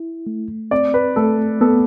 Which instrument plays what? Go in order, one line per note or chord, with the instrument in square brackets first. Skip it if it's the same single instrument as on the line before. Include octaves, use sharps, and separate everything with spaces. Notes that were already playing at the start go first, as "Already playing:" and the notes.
Already playing: [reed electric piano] E4
A3
[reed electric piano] C4 [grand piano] D5
[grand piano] B4
[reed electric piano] A3 [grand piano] A4
[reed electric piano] B3 [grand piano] A4